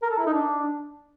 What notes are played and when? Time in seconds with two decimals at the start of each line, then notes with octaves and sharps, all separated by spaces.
0.02 A#4
0.10 A4
0.18 E4
0.26 D#4
0.34 D4